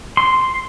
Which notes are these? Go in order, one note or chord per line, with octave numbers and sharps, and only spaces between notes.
C6